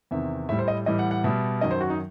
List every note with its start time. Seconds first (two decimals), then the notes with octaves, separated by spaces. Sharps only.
0.11 E2 C3 D#3 E5
0.49 A2 G3 E5
0.59 C5
0.68 D#5
0.86 A2 E3 G3 D#5
0.99 F#5
1.11 F#5
1.24 B2 G3 E5
1.61 F#2 D#3 F#3 D#5
1.71 C5
1.81 F#4
1.90 D#4